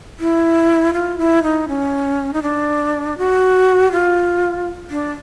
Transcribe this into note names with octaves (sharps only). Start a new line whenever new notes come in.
E4
F4
E4
D#4
C#4
D#4
D4
F#4
F4
D4